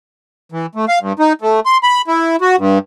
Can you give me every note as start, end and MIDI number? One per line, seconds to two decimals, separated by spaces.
0.52 0.66 52
0.75 0.85 57
0.88 0.99 77
1.00 1.13 43
1.19 1.33 63
1.41 1.60 57
1.66 1.78 84
1.83 2.02 83
2.08 2.36 64
2.41 2.56 66
2.58 2.78 43